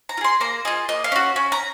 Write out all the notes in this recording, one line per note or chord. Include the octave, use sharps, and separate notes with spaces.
A#5
F4
G#4 C6
A#3 A#5
F4 G#4 D#5
A#3 D#5
F5
C#4 F#4
C#4
A#5